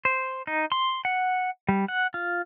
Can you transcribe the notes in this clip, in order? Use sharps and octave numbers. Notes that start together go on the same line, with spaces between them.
C5
D#4
C6
F#5
G3
F#5
F4